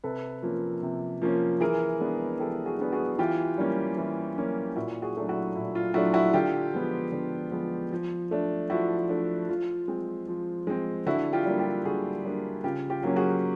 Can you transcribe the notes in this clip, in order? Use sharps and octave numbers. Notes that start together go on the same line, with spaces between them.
C3 A4 B4
F3 A#3 C#4
C3
F3 A#3 C#4
E3 G#4 A#4
G#3 B3 D4
E3 G4 A4
F#4 G#4
G#3 B3 D4
F#4 G#4
E3 F4 G4
G3 A#3 C#4
E3
G3 A#3 C#4
A#2 E4 F#4
F#4 G#4
F#3 A3 D4
E4 F#4
A#2 E4
F4
F#3 A3 D4 E4 F#4
E4 F#4
D3 F4 G4
F3 G#3 B3
D3
F3 G#3 B3
F3
A3 D4
F3 E4 F#4
A3 D4
F3 F4
G#3 C4
F3
G#3 C4
D3 E4 F#4
F4 G4
G3 A#3 D4
F4 G4
D3 F#4 G#4
G3 A#3 D4
C#3 F4 G4
F4 G4
F#3 A#3 C#4
F#4 G#4